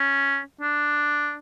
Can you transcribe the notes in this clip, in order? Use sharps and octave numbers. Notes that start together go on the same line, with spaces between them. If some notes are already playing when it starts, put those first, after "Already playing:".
Already playing: C#4
D4